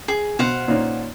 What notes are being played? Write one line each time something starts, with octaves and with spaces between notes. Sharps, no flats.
G#4
B2 C5 F5 F#5
A#2 C#4 D#4